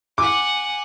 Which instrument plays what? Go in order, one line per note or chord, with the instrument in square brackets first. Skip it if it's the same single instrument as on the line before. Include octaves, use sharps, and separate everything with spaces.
[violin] F#5 G#5 [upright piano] D6